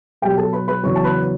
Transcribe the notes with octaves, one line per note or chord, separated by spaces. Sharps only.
B2 F#3 G4 G5
A4 A5
B4 B5
B4 B5
E2 C#3 F#3 C#5 C#6
A5
B4 B5